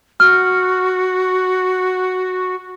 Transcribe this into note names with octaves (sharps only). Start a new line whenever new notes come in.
F#4 F6